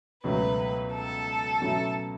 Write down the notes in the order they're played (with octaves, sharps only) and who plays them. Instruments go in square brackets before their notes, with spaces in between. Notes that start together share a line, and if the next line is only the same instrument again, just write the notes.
[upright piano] C#2 B2 F#3 A3 [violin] B4
[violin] A4
[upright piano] B2 F#3 A3 C#4 E4